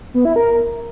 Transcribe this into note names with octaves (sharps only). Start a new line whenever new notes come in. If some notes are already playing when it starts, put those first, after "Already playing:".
B3
E4
A#4